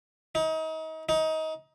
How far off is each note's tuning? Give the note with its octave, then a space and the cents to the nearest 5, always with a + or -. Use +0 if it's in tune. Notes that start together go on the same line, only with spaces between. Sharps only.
D#4 +35
D#4 +25